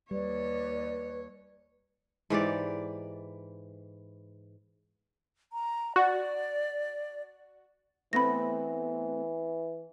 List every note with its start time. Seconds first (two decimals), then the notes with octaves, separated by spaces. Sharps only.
0.11 D#2 G3 B4 C#5 D5
2.30 G#2 E3 G4 D5
5.53 A#5
5.96 F#4 D5
8.13 E3 A3 B3 C4 B5 A#6